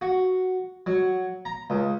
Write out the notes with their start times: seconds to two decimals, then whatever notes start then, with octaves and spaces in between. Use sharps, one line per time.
0.01 F#4
0.86 F#3
1.45 A#5
1.70 C#2